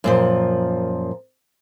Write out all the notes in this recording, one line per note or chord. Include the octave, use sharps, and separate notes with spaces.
F#2 A#2 F3